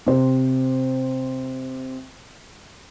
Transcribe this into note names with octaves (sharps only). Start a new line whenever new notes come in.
C3 C5